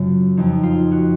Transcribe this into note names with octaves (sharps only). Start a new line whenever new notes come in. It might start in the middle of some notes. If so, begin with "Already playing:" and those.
Already playing: F#2 C#3 F#3 F4
F2 F3 D#4
F4
F#4